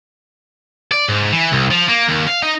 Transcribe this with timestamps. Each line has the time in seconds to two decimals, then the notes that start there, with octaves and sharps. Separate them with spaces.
0.92 D5
1.09 G#2
1.33 E3
1.52 C2
1.71 F3
1.88 A#3
2.08 D#2
2.27 F5
2.43 D#4